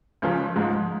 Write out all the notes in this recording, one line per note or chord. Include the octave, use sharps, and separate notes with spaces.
C#2 C#3 F3
G#2 F3 G#3